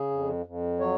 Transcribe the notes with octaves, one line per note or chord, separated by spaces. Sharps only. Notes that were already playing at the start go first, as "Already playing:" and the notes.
Already playing: C#3 G#4
F2
F2
F#3 C#5